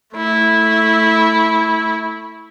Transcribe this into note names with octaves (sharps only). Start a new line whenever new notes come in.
A3 E4